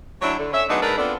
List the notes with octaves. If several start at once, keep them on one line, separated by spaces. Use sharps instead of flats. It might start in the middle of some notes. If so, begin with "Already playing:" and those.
F#3 A3 C#4 D4 E4 C#5
D3
C#4 E5
F#3 G#3 A3 B3 D4 D#4
G#2 D4 A#4 B4
B3 C4 D4 F4 A4